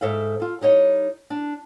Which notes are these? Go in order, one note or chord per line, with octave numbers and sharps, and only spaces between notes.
G#2 A4 E5 F5
F4 A4
G3 D#4 C#5 D#5
D4